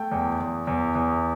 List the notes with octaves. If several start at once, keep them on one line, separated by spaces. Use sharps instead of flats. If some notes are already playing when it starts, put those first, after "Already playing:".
Already playing: A3 G5
E2
E2
E2
E2